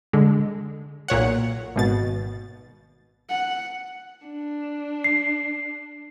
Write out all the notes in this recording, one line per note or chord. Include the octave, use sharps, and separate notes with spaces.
D3 G#3
B1 A#2 C#5 F#5
G#1 B2 A6
F#5
D4
C7